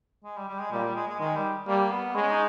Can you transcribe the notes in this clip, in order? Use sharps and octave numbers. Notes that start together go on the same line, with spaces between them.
G#3
G3
G3
G#3
A#2 G3
G3
G#3
G#3
D#3 G#3
G3
G3 A#3
B3
G#3 C#4
D#4